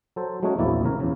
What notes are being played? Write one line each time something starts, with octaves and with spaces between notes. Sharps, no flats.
F#3 A4 C5
F#3 G#3 A3 C#4 F#4 G#4
A#1 E2 A#3 C4 E4 D5
A1 C#3 A#4 C#5
E2 C#3